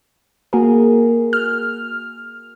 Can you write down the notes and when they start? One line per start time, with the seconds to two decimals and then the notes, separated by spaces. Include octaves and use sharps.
0.53 A#3 F#4 G#4 A#4
1.33 F6